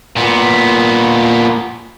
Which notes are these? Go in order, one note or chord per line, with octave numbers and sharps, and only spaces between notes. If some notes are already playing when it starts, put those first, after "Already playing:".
A#2 B3